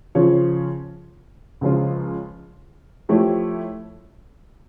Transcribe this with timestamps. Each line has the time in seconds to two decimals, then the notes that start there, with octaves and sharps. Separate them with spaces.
0.15 C#3 F3 C#4 F4 C#5
1.61 C#2 C#3 F3 C#4 F4
3.09 F3 A3 E4 G4 C#5